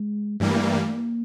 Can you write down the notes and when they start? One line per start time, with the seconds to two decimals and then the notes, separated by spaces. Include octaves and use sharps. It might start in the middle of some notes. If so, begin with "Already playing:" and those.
Already playing: G#3
0.40 G2 E3 G3 A3 A#3
0.94 A#3